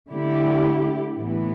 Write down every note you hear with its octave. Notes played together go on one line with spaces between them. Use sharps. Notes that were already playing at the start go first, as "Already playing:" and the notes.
D3 A3 E4 G4
A2 E3 B3